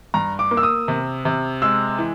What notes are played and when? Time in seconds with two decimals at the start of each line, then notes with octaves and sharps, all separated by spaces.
0.14 G2 A#5
0.39 D6
0.51 A#3
0.57 E6
0.63 D#6
0.88 C3
1.25 C3
1.62 G#3 E6
1.98 E3